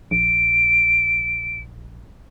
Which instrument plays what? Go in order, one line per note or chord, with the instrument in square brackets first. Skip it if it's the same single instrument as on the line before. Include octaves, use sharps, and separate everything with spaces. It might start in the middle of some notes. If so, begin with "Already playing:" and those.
[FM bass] A#1 [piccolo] D7